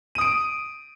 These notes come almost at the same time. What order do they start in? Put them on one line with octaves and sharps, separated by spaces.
D#7 D#6 D7